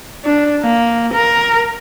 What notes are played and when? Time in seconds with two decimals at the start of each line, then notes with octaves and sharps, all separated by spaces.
0.24 D4
0.63 A#3
1.14 A#4